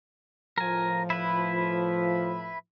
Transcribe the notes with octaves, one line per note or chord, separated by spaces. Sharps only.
A2 F3 A#4 G#5
E4 B4